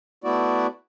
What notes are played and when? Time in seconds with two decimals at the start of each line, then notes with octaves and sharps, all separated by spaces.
0.24 A3 B3 E4 F#4 D5